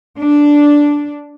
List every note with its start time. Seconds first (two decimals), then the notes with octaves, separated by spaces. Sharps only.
0.17 D4